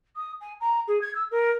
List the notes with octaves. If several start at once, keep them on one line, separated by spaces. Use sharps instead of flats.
D#6
G#5
A#5
G#4
G#6
E6
A#4